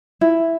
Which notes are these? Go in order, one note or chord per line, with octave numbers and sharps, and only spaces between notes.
E4